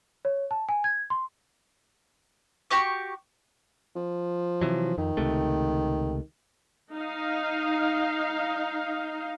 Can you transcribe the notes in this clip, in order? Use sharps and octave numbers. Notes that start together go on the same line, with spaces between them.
C#5
A5
G#5
G#6
C6
F#4 G4 C#6 D6
F3
C3 E3 F#3
F2 D#3
C#2 C3 A3
D#4 F5